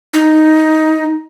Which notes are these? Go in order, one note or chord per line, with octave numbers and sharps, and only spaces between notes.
D#4